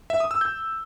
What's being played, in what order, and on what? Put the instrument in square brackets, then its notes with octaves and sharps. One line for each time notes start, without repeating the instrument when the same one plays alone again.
[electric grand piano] E5
D#6
E6
G6